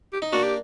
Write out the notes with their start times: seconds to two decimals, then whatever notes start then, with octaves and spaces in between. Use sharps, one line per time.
0.13 G4
0.22 D#4
0.33 A#3 D4 F#4
0.43 G4